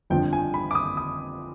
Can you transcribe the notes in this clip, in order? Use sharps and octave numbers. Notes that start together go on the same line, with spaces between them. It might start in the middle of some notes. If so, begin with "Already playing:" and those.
G1 F2 D3 F3 G5
G#5
B5
D6
D#6
D#6